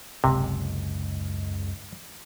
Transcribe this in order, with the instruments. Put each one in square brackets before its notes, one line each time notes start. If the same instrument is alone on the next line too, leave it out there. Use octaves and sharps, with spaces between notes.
[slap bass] F#1 C#2 G#2 [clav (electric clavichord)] C3